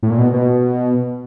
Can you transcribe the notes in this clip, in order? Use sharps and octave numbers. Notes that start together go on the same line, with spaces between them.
A2
A#2
B2
B2